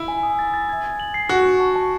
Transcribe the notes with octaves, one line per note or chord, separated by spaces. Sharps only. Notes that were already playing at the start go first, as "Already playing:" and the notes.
Already playing: E4
G#5
D#6
A6
A6
G#6
G#6
F#7
C7
F#4 C#6
C#6
A5
A5